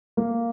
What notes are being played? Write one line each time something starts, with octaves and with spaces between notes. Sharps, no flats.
A#3